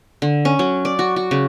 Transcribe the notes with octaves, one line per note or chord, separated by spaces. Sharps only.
D3
C#4
F#3
D5
F#4
F#4
C#3